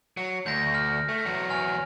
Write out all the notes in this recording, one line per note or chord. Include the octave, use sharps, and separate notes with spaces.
F#3
D2 G6 A#6
F6
A3
E2 F#3
G#5 F6 F7